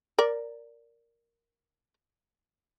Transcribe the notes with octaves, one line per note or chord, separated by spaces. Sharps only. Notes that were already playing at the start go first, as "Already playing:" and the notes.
A#4 D5